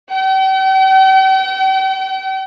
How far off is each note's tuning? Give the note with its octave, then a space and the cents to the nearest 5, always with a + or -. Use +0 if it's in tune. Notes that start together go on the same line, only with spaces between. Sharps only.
G5 -40